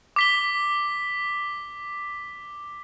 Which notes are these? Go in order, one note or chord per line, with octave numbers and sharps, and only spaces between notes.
D6 B6 G7